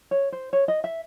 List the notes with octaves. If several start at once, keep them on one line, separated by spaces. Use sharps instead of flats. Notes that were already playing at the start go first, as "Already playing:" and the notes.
C#5
C5
C#5
D#5
E5